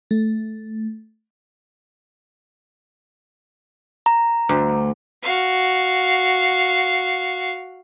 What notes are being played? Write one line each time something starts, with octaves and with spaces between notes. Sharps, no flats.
A3
A#5
D2
F#4 F5